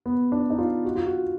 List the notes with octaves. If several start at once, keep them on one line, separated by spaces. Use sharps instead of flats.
B3
D4
D#4
F4
F#4
F4
F#4